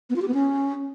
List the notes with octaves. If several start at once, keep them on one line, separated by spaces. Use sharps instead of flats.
B3
F4
G4
B3
C#4